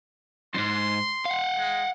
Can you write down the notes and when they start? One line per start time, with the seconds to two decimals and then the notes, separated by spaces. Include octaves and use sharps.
0.54 F2 G#2 C6
1.25 F5 F#5
1.58 G#3